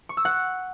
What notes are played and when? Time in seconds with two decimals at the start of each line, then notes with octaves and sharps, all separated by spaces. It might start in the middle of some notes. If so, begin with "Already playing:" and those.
0.09 C#6
0.17 E6
0.25 F#5